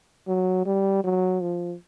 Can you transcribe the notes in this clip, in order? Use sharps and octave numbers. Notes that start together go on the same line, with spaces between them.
F#3
G3
F#3
F3